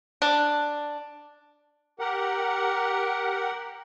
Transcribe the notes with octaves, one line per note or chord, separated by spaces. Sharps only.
D4
G4 A#4 F#5